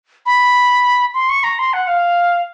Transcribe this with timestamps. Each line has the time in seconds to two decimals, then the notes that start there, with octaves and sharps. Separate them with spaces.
0.26 B5
1.14 C6
1.29 C#6
1.43 A#5
1.59 C6
1.73 F#5
1.87 F5